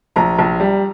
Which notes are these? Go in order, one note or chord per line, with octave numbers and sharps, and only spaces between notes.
A#1 A#5
A#1
G3